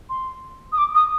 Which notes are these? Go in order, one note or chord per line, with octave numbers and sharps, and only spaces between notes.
C6
D#6
D6
D#6